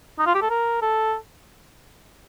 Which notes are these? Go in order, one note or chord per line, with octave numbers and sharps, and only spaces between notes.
D#4
F4
G4
A4
A#4
A4